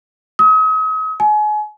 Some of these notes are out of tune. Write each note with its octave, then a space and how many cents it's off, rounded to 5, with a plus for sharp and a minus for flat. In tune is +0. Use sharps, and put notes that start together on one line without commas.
D#6 +40
G#5 +35